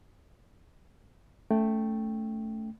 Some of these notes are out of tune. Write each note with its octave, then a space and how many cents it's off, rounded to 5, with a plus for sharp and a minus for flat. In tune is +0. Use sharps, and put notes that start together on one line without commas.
A3 +0 C#4 +30 G5 +0